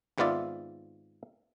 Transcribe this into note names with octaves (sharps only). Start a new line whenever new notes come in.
G#1 G#2 B3 F4 D5 E5